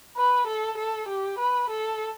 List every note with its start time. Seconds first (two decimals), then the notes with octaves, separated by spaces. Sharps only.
0.17 B4
0.47 A4
0.77 A4
1.08 G4
1.39 B4
1.69 A4